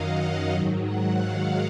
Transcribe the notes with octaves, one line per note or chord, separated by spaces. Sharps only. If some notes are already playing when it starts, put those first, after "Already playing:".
Already playing: F#2 D#3 F#3 D#5 F5 F#5
F5
G#2 D#3 F#3
F#5
F5